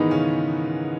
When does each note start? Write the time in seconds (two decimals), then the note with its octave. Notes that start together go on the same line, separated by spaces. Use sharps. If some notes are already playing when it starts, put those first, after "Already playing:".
Already playing: G#2 D#3 E3 G#3 B3 D#4 B4
0.11 C#3 C#4